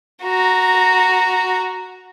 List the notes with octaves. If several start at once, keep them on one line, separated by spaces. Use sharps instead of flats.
F#4 A#5